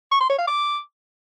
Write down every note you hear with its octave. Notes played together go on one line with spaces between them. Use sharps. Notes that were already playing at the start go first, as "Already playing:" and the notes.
C#6
C6
C#5
F5
D6